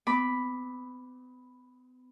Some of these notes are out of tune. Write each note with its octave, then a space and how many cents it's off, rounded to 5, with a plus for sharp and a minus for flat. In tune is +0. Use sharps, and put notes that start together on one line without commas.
B3 +40 B5 +0 D6 +0